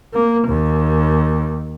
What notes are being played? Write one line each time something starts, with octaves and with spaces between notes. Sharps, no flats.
A#3
D#2